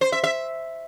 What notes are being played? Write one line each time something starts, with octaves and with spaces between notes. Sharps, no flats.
C5
E5
E5